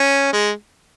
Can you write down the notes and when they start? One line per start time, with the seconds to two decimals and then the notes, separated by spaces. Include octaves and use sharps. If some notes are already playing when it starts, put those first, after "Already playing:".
Already playing: C#4
0.33 G#3